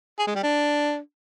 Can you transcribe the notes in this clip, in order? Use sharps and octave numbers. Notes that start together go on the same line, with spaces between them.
G#4
G#3
G3
D4